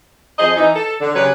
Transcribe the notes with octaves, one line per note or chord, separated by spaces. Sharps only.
F2 F3 G#4 C5 D#5
E3 D#4
A4
D3
C#3 F#3 C#4 G4 B4 C#5